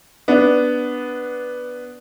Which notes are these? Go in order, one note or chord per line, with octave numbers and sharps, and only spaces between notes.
B3 D4